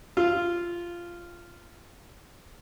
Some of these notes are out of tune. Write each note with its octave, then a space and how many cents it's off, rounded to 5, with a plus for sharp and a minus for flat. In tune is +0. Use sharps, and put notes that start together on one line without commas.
F4 -10